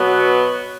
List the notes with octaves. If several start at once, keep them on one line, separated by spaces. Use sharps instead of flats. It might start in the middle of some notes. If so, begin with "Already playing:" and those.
Already playing: B2 F#3 B3